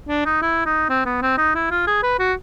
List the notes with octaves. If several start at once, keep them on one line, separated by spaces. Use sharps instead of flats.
D4
D#4
E4
D#4
C4
B3
C4
D#4
E4
F4
G#4
B4
F#4